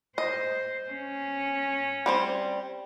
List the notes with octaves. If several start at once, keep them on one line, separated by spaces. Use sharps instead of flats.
C5 D#5
C#4
G3 C4 C5